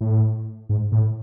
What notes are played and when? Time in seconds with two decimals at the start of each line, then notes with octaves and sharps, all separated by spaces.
0.01 A2
0.69 G#2
0.92 A2